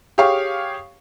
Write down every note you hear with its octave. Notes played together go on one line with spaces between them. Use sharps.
G4 G#4 C#5 F5 C#6